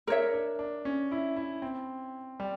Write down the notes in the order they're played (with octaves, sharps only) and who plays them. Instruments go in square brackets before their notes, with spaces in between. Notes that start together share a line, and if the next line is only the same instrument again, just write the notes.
[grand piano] D4 [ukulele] A#4 C#5 E5
[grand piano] D4
D4
C#4
E4
E4
C4
G3